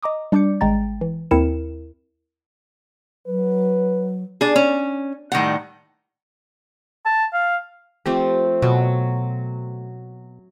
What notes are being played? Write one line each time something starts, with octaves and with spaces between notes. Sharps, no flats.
D#5 A#5 D6 D#6
G3 D4 D5 D6 G6 C#7
G#1 G#3 G5 A#5 A6
E3
D#2 C4 E4 A#4 C#7 E7
F#3 B4
D4 G#4
C#4
A2 D#3 G3 F#5
A5
F5
F3 A3 C4 G4
B2 F#3